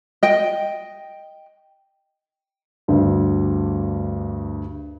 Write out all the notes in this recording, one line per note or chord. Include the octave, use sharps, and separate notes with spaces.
D#5 G5
D2 G2